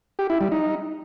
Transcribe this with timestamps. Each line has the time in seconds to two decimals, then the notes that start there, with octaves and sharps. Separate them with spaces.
0.19 G4
0.30 E4
0.41 G3
0.52 D#4